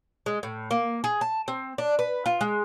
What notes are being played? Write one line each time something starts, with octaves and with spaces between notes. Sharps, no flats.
G#3
A2
A#3
G#4
A5
C4
D4
B4
F4
G#3